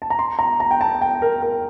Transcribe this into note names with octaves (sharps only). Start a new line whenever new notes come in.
A5
A#5
C6
A#5
A#5
G5
A5
G5
A#4
A#4